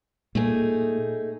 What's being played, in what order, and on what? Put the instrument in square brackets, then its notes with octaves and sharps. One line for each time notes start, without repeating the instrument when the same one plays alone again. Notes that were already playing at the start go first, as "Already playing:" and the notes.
[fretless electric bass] A#2 [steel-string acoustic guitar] A3 D#4 G#4